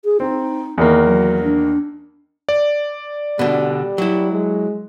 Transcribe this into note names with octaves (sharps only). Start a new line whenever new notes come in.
G#4
C4 D#4
E2 D#3 A#3
F#3
D4
D5
B2 D3 G3
F#3 E4
G#3